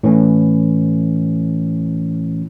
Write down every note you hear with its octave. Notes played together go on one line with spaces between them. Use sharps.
A2 E3 C#4